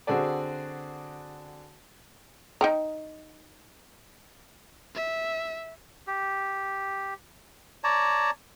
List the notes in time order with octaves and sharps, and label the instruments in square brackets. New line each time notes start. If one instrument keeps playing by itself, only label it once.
[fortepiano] D3 C4 F#4 G#4 A4 D5
[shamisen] D#4 G5 A#5
[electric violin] E5
[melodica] G4
C#5 D5 A5 A#5